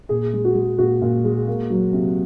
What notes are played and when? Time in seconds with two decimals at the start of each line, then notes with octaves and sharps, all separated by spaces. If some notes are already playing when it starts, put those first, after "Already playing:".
0.09 A#2 G#4
0.33 G#3
0.45 F#4
0.55 G#3
0.78 A#2 F#4
1.02 A#2
1.24 G#3
1.48 A#3
1.70 F#3
1.93 C3